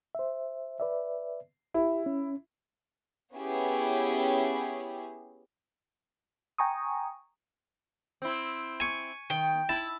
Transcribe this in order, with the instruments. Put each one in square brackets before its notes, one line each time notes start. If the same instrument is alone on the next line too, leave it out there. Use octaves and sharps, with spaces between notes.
[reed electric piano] C5 E5
B4 D5 E5
[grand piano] E4 [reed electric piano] G4
[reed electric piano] C#4
[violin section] B3 C#4 E4 G4 G#4
[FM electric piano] G5 G#5 A#5 C#6 D#6
[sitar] C4 E4
[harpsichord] G#5 C#6
[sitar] D#3 [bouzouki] G5
[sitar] E4 [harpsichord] A5